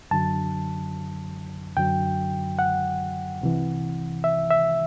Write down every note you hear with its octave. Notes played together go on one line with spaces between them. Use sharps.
F#2 D3 F#3 A5
F#2 D3 F#3 G5
F#5
C2 C3 E3
E5
E5